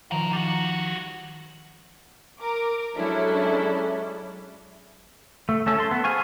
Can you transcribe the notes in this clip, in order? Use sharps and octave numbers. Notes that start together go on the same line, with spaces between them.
D#3 F3 F#4 A#4 F5
G3 F#4
A#4 D6
F#3 G#3 C#4 D4 E4 A4
A3
A3 C#4 A4
A4 C6
B3
G#4 C5 F5 G#5 C#6